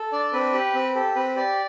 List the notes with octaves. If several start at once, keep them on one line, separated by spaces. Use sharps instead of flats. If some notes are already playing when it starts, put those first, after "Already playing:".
Already playing: A4
D4 D5
C4 B4
G4
C4
G4 A4
C4 B4
G4 D5